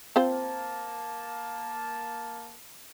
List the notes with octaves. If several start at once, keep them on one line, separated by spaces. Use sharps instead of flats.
A#3 C4 F4 C5 A5